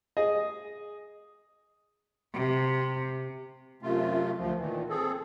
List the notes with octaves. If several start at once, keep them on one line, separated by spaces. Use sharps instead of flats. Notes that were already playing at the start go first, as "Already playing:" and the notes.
G#4 D#5
C3
F#2 C3 A3 F4
D2 F3
A#2 D#3 E3
C4 G#4 A4